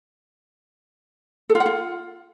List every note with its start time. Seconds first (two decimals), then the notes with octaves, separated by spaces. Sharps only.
1.49 A4
1.55 F4
1.60 F#5
1.66 F4